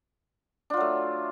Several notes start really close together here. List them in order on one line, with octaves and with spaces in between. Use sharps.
D4 F4 F#3 A3